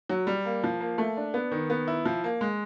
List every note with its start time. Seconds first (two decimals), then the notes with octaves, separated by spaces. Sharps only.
0.10 F#3
0.27 G3
0.45 A#3
0.64 F3
0.81 A#3
0.98 A3
1.17 D4
1.34 B3
1.51 D#3
1.70 B3
1.87 E4
2.05 F3
2.24 A#3
2.41 G#3